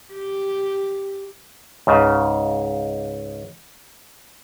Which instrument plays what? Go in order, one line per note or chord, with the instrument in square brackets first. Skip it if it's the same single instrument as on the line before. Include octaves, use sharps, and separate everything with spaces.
[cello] G4
[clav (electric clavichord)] C#2 G#2 C#3